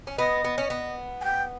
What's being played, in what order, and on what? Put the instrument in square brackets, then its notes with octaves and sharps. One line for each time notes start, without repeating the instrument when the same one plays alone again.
[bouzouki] C#4
[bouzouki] B3 [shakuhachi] D#5
[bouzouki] B3
C#4
B3
[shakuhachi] G#5
G5